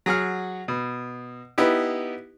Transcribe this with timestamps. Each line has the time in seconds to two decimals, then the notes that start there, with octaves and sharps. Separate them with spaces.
0.06 F#3 G#4 F#5 F6
0.68 B2
1.58 B3 D#4 E4 G4